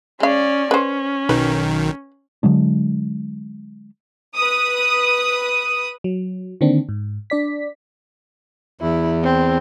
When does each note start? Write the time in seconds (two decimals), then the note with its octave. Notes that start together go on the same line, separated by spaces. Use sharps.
0.20 G#3 C#4 D5 F5
0.71 C#4 B4 C5
1.29 B1 D#3 B4
2.43 D3 F#3 G#3 D4
4.36 B4 D#6
6.04 F#3
6.61 D3 D#3 A#3 C4 D4
6.89 G#2
7.30 D4 D5 B6
8.81 E2 E4
9.23 C4